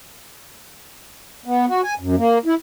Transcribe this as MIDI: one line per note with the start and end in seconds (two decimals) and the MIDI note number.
1.46 1.66 59
1.67 1.81 66
1.84 1.94 80
1.99 2.16 42
2.17 2.38 58
2.45 2.55 64